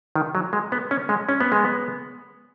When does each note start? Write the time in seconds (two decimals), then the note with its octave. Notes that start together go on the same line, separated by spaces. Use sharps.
0.16 D#3
0.35 F#3
0.53 G#3
0.72 B3
0.91 C#4
1.09 G#3
1.29 C#4
1.41 B3
1.52 G#3
1.65 B3